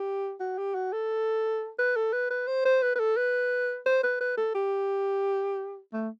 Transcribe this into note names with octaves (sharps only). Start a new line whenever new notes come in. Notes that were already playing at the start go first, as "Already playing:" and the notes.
Already playing: G4
F#4
G4
F#4
A4
B4
A4
B4
B4
C5
C5
B4
B4
A4
B4
C5
B4
B4
A4
G4
A3